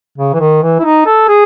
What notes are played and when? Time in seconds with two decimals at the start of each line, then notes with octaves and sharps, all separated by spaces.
0.18 C#3
0.33 E3
0.40 D#3
0.62 E3
0.79 E4
0.84 D#4
1.06 A4
1.28 G#4